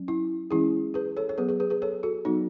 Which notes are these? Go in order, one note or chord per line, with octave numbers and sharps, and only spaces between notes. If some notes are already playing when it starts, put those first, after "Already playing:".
Already playing: F#3 C#4
E4
E3 G#3 C#4 E4 G#4
G#4 B4
A4 C#5
C#5
F#3 B3 G#4 B4
G#4 B4
G#4 B4
G#4 B4
A4 C#5
F#4 A4
F#3 B3 D#4 F#4